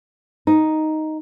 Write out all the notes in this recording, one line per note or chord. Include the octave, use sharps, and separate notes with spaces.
D#4